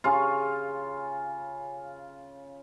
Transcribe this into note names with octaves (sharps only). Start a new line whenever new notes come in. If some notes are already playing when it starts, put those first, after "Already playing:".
C#3 F4